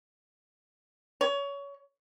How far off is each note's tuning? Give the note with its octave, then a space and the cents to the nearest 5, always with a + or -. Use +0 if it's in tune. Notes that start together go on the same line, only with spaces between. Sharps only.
C#5 +25